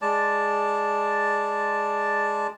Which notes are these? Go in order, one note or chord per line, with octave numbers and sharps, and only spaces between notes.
G#3 D5 A5